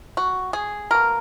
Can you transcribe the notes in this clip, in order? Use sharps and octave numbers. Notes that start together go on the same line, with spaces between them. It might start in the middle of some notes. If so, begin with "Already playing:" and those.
F#4
G#4
B2 A#3 A#4